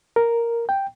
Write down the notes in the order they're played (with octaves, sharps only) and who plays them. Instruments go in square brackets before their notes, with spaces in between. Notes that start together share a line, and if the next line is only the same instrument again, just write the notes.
[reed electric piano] A#4
G5